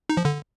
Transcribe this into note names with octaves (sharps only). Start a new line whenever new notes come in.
D#4
F3
D3